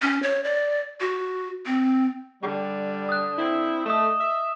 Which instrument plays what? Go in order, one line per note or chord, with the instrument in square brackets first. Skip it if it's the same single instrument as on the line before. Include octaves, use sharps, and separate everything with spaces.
[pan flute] C#4
C#5
D5
F#4
C4
[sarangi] D3 [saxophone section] G3
[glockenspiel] D#6 F#6
[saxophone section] C4 E4
[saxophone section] A3 [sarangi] D#5 [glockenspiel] D#6 E7
[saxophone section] E5